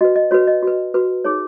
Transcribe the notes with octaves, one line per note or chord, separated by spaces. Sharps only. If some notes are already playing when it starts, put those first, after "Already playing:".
F#4 B4 D#5
D#5
F#4 B4 C#5
D#5
F#4 B4
F#4 B4
D#4 G#4 C#5